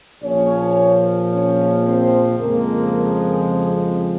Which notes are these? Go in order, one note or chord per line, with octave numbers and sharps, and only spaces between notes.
A#1 A#2 F3 C#4 C#5
C#4 C#5
C4 C5
F2 C#3 F3 G#3 A#3 A#4
C4 C5